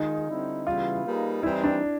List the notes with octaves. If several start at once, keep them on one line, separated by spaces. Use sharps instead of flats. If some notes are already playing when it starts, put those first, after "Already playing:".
Already playing: D#3 G#3 D#4 F4 G#4
D3 G3 C4 E4
C#3 E3 G3 B3 E4 F4
G3 A#3 D#4 G#4 B4
E3 G3 C4 D#4 E4
D4